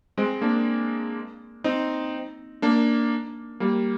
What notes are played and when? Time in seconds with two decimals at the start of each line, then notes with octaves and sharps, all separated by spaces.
0.18 G#3 C4
0.42 A#3 D4
1.64 C4 D#4
2.62 A#3 D4
3.60 G3 A#3